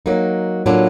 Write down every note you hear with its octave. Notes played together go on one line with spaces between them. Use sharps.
F#3 A#3 D#4
A2 F#3 A#3 D4 F4